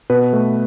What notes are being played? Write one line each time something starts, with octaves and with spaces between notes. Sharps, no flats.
B2 B4
A3